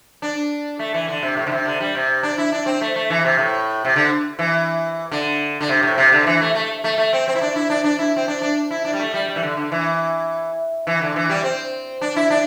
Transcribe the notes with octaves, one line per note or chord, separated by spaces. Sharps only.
D4
A3
E3
D3
C3
A2
D3
C3
D3
G3
C3
D4
E4
D4
C4
A3
A3
E3
C3
A2
C3
D3
E3
D3
D3
C3
A2
C3
D3
E3
A3
A3
A3
A3
C4
C4
E4
D4
E4
D4
D4
E4
C4
D4
D4
E4
D4
G3
A3
G3
G3
E3
D3
D3
E3
E3
D3
E3
G3
C4
D4
E4
D4